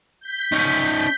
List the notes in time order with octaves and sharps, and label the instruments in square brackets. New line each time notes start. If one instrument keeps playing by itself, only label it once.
[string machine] G6 B6
[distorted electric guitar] C#4 D#4